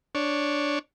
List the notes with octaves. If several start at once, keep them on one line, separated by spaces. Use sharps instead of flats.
D4 C#5